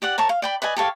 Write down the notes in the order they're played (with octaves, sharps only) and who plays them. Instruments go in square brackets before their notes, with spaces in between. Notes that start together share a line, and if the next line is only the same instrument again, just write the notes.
[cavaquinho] G4 D5 F#5
A#4 C#5 A5 C#6
F5
D5 G5 B5
B4 D5 D#5 G#5
G4 A4 C#5 F5